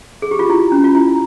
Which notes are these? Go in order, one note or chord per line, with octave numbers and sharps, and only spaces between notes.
G#4
G4
F4
E4
C#4
F4
E4